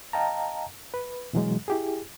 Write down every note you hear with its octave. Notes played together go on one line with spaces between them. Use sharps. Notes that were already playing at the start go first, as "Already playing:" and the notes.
D#5 F5 G5 A5 A#5
B4
B2 E3 F#3 G#3
E4 G4 G#4